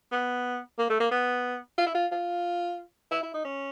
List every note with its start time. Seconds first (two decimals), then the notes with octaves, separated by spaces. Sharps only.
0.12 B3
0.79 A#3
0.90 A3
1.00 A#3
1.11 B3
1.78 F4
1.86 E4
1.95 F4
2.12 F4
3.11 E4
3.23 E4
3.34 D#4
3.45 C#4